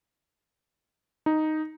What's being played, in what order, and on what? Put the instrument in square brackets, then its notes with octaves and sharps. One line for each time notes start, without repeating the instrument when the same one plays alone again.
[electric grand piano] D#4